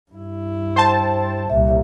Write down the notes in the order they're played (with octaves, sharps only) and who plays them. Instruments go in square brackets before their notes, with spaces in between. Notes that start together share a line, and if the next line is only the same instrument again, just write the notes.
[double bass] G2 E4
[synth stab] C5 A5 [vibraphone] G5
[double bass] C2 A#2 [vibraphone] E5